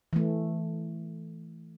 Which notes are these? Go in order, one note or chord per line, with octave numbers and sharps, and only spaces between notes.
E3 A3